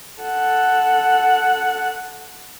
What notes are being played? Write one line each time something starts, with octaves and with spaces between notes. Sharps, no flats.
A4 F#5